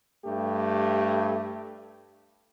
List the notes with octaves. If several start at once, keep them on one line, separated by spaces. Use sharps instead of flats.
G2 A3 G4